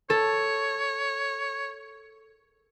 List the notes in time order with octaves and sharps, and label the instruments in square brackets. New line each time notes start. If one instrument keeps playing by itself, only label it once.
[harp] A4 [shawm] C#5